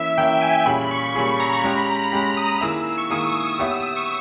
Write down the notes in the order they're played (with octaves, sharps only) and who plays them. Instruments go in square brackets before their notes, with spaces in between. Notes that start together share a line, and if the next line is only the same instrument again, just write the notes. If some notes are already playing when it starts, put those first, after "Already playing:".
Already playing: [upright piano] E3 A#3 C#4 E4 [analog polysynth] E5
[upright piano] E3 A#3 C#4 E4 [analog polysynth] G5
[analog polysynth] G#5
[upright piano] A#2 G3 C#4 G#4 [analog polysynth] B5
[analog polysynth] C#6
[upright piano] A#2 G3 C#4 G#4 [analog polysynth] B5
[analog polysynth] A#5
[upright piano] G#3 C#4 G4 [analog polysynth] A#5
[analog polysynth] B5
A#5
B5
[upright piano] G#3 C#4 G4 [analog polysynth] B5
[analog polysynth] D#6
[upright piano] D#3 A#3 E4 G#4 [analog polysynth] E6
[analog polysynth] E6
C#6
[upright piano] D#3 A#3 E4 G#4 [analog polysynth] D#6
[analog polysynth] C#6
[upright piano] B3 G4 C#5 E5 [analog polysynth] D#6
[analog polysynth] E6
D#6
C#6